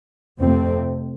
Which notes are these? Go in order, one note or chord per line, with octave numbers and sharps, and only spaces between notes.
F2 C3 A3 C4